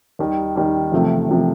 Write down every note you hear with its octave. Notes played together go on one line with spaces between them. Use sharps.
D#2 D#3 G3
D#2 D#3 G3
E2 C3 F3 A3
E2 C3 F3 A3